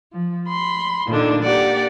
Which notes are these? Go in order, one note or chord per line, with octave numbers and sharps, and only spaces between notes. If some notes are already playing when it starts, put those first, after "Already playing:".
F3
B5 C6
A#2 D3 D#3 D4
A#3 G4 D5 F#5